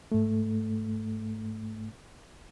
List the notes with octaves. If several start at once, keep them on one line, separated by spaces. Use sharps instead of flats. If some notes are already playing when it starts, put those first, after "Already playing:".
G#2 A3